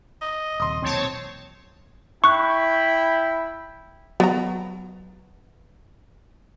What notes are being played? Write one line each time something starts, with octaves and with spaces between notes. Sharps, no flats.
D#5
D#1 C3 C6 D#6
B1 E2 A#2 C4 C#5 A5
E4 G5 B5 C#6 F#6
F#3 B3 A#5